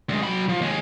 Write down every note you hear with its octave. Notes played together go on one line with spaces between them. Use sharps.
D2 G#3
F#3 B5
F3
D#2 G#3